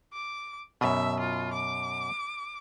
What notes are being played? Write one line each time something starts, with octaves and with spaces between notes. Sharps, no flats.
D6
F#2 B2 E5
F4
D6